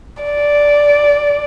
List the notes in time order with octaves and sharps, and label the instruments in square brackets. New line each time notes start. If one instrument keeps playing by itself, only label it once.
[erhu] D5